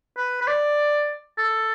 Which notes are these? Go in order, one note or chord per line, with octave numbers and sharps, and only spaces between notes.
B4
B4
D5
A4